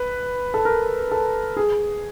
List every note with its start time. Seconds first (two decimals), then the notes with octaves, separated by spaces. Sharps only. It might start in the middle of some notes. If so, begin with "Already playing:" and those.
Already playing: B4
0.54 A4
0.65 A#4
1.12 A4
1.57 G#4